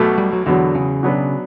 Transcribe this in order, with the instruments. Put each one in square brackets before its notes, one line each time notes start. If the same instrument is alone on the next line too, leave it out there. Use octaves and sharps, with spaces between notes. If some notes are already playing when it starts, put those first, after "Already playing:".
Already playing: [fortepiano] B1 B2 A3
[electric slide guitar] G3
F#3
[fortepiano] E2 B2 F#3 [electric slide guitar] D3
[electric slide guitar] C#3
[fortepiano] B2 F#3 B3 D4